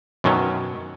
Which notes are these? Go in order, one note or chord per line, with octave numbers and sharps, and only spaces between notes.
F#2 B2 D#3 F#3 C#4